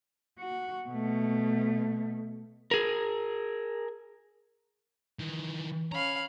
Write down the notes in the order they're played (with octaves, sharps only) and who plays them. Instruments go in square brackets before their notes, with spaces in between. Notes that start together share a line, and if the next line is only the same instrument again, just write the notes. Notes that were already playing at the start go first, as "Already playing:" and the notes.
[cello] F#4
B2 A3
[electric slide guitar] G#4 A#4
[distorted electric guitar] D#3 E3
[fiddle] C#4 F5 [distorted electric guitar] A#5 B5